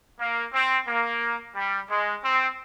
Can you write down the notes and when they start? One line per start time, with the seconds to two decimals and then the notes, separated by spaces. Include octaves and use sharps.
0.20 A#3
0.54 C4
0.88 A#3
1.56 G3
1.90 G#3
2.23 C4